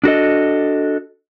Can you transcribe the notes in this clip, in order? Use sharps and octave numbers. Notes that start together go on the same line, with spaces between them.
D4 F#4 A4 D#5